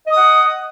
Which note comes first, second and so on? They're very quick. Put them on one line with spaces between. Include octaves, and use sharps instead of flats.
D#5 D#6 F#5